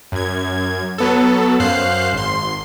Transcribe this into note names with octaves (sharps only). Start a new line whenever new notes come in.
F#2 G#6
F#3 B3 A4
F#2 C5 F5 F#6 C7
G#1 C6